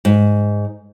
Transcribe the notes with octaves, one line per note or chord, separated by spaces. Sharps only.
G#2